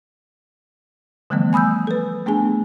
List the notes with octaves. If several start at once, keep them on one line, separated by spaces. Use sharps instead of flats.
D3 E3 F3 G3 A3 B3
G#5 B5 D#6 E6 G6
A4 B4
A3 B3 D4 G#4 G#5